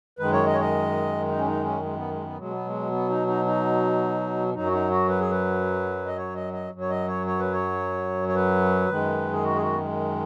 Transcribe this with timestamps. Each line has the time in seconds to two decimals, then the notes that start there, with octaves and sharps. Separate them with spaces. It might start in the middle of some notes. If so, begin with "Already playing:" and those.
0.19 F#2 D#3 G#3 B4
0.33 C#5
0.47 D#5
0.53 C#5
0.60 D#5
1.28 D#4
1.38 C#4
1.46 D#4
1.65 C#4
1.82 G#3
1.96 B3
2.10 G#3
2.24 B3
2.37 B2 F#3 G#3
2.53 B3
2.66 G#3
2.91 B3
3.09 D#4
3.27 D#4
3.45 D#4
4.54 F#2 F#3 D#4
4.66 F#4
4.72 D#4
4.90 F#4
5.09 B4
5.20 G#4
5.31 B4
6.06 D#5
6.18 C#5
6.35 D#5
6.53 D#5
6.72 F#2 F#3
6.81 C#5
6.90 D#5
7.08 C#5
7.27 C#5
7.39 B4
7.53 C#5
8.28 C#5
8.35 B4
8.90 F#2 D#3 G#3
9.33 G#4
9.43 F#4
9.56 G#4
9.61 F#4
9.73 B3
9.80 G#3